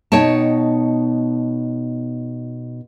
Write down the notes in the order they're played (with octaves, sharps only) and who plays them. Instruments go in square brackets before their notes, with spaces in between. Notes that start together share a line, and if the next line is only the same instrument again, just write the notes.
[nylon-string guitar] B2 D#4 C#5 G5 A5